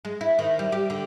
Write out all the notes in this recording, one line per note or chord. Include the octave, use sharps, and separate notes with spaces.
G#3
E4
D#3
G3
G4
D3